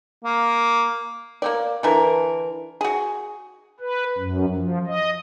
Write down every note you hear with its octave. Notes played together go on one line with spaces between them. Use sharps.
A#3
A#3 C4 D5
D3 E3 A#4
F#4 G#4
B4
F#2
F3
D#5